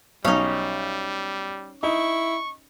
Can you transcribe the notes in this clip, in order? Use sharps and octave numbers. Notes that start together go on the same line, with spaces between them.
B1 G3 C#4 D#4
D#4 E4 C#6